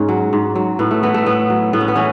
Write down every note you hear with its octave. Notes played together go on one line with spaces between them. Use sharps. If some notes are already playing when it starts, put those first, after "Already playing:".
Already playing: G#2 C#4
F#3
G#2
F#3
A2 B3
A3
E3 B3
A3
A2 B3
F#3
A2 B3
C#4
B3
E3 C#4